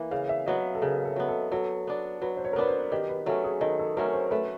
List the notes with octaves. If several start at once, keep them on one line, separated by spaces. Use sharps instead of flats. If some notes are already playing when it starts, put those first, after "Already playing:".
Already playing: E3 A#3
C#3 F5
E5
F#3 B3 D#5
A4
C#3 A#4
A4
F#3 B3
A4
F#3 A4
B3 D4
F#3 B4
C5
C#5
A#4
B3 D4 B4
C5
D#3 G4
B4
F#3 A3 C#4 A4
G#4
D#3 A4
A4
F#3 A3 C#4 A#4
C5
A3 B4